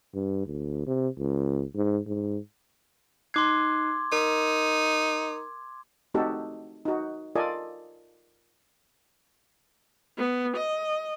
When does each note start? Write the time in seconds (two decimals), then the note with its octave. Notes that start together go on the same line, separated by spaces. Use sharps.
0.14 G2
0.46 D2
0.87 C3
1.18 C#2
1.75 G#2
2.07 G#2
3.34 D#4 C6 D6 F#6 G#6 C7
4.12 D#4 A#4
6.14 A3 C4 D#4 F#4 G4 A4
6.85 D#4 F#4
7.36 F4 A4 A#4 D5 D#5 G#5
10.18 B3
10.56 D#5